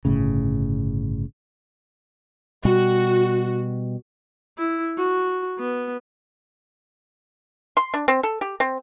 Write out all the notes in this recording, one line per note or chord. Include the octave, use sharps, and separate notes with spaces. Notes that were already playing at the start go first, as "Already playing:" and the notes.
G1 A2 C#3
B2 G3 F#4
E4
F#4
B3
C6
D4
C4
A4
G4
C4